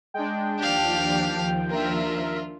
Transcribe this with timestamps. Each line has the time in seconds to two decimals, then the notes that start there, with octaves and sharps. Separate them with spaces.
0.14 G#3 D4 G5
0.59 D#2 F3 D4 G4 F5
1.70 D4 F4 A#4 E5